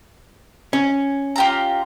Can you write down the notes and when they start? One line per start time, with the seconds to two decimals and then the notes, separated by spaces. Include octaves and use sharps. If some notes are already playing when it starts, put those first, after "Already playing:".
0.73 C#4
1.36 F4 G4 A#5